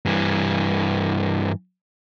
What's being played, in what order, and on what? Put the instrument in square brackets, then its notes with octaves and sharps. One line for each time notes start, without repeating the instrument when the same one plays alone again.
[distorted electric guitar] G2 E3